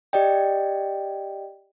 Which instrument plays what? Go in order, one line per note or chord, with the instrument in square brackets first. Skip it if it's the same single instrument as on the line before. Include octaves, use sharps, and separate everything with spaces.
[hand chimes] G4 D5 D#5 G5